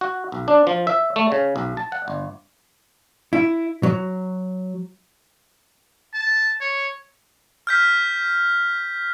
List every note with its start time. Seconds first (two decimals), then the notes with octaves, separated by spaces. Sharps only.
0.01 F#4
0.32 B1
0.48 D4
0.67 F3
0.87 E5
1.16 A3
1.32 C#3
1.56 B1
1.77 A5
1.92 F#5
2.08 G1
3.33 E4
3.83 F#3
6.14 A5
6.61 C#5
7.67 F6 G6 B6